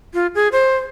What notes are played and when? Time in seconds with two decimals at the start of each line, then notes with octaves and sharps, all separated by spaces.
0.14 F4
0.35 G#4
0.52 C5